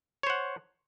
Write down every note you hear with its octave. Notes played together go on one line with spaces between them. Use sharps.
C5 C#5 F#5